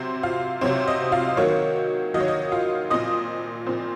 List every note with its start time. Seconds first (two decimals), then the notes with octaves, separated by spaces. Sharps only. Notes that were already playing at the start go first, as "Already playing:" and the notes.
Already playing: C3 F#3 C4
0.23 F4 F5
0.61 C3 F#3 C4 C#5
0.88 D#5
1.12 F4 F5
1.37 D#3 F#3 A#3 C#5
2.14 D#3 F#3 A#3 D#5
2.21 C#5
2.28 D#5
2.52 F4 F5
2.90 A#2 F3 C4 D#5 D#6
3.67 A#2 F3 C4